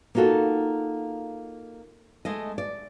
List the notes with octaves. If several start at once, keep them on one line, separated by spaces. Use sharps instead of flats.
A#3 D#4 F4 F#4 A4
G#3 A3 D#5
D5